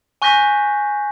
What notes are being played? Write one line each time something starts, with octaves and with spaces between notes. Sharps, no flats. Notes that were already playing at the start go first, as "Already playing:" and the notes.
G#5 C#6 F#6 G6 A#6 B6